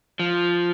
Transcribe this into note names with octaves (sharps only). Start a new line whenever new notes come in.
F3